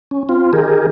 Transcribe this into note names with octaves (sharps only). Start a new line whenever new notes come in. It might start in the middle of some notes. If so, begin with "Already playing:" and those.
C#4
C4 F4
D#3 G4 G#4 A#4